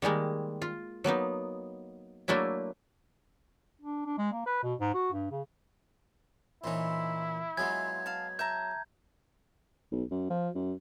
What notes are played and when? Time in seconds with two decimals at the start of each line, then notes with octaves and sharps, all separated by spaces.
0.02 D#3 G3 G#3 A#3
0.62 F4
1.04 F#3 A#3 B3 D#4
2.28 F#3 A3 A#3 D4 E4
3.82 D4
4.06 D4
4.18 G#3
4.32 A#3
4.46 B4
4.63 B2
4.80 G#2
4.94 F#4
5.12 G2
5.31 C#3
6.64 A#2 E3 C#4 D#4 E4 C5
7.57 F#3 G#3 B3 F4 D#5 G#5 G#6
8.06 F5 A5
8.39 E5 A5 A#5 G6
9.92 B1
10.11 F#2
10.30 F3
10.55 F#2